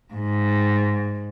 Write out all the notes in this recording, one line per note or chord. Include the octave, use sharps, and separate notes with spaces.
G#2